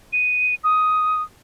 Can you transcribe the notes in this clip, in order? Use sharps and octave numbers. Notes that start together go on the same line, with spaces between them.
D#7
D#6